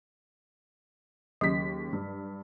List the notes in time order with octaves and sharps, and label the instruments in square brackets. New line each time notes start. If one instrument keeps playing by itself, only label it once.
[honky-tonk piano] D#2 C#3 B6 [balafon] F#3
[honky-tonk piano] G2